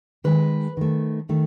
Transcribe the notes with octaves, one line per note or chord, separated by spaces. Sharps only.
D#3 G#3 B4
D#3 A3
D#3 A3